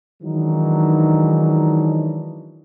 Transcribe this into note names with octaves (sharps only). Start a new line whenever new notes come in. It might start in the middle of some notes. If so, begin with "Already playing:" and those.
D#3 E3 F#3 G#3 D4 D#4